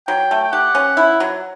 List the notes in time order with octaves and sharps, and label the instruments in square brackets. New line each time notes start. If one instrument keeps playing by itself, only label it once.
[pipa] F#3 [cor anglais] G5
[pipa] A3
[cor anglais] G5
[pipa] G4 [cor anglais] F#5
[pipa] C#4
E4
F#3